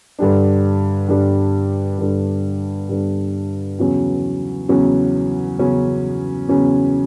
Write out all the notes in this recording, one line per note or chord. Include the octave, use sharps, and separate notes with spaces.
G2 D3 G3 D4
G2 D3 G3 D4
G2 D3 G3 D4
G2 D3 G3 D4
E2 C#3 F#3 C#4
E2 C#3 F#3 C#4
E2 C#3 F#3 C#4
E2 C#3 F#3 C#4